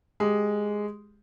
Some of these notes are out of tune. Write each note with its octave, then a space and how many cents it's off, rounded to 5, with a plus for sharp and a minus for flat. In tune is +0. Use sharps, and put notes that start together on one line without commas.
G#3 +0 G4 +0